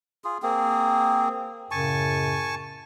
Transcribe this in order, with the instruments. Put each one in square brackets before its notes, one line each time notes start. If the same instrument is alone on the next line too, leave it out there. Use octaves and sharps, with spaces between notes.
[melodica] F4 G#4
A#3 C4 G#4
[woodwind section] F#2 A2 C#3 [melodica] G#5 A5 C#6